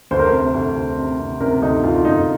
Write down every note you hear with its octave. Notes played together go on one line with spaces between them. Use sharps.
D2 C5
A#4
C3 C5
D2
D2
C3
C3
C3 A#4
D2 D#4
D2 F4
D2 D#4